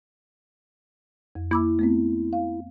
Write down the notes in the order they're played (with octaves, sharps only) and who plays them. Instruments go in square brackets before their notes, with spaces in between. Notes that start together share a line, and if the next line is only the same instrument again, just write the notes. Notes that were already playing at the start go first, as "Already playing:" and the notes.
[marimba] F2
[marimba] A#3 D6 E6 [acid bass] E4
[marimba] A3 B3 C4
F5